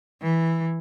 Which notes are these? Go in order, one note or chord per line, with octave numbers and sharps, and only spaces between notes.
E3